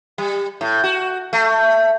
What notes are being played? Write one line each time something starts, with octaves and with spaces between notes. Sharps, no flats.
G3
A2
F#4
A3